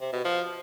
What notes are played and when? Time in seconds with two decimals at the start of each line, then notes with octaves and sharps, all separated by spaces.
0.01 C3
0.13 B2
0.25 F3